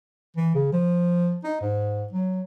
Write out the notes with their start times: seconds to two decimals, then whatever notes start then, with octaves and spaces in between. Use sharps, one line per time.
0.36 E3
0.55 C#3
0.73 F3
1.44 D#4
1.61 G#2
2.12 F#3